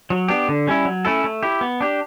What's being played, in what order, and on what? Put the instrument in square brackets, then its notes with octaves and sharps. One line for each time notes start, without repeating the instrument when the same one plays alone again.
[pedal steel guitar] F#3
B3 D4 G4
D3
G3 C#4 E4
F#3
A3 C#4 E4 A4
A3
E4 G4
B3
D4 G4